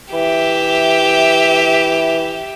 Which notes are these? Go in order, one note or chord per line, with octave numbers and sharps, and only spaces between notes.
E3 G4 E5